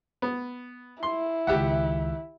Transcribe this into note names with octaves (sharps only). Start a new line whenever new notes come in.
B3
E4 C6
C#2 D#3 G4 E5 F#5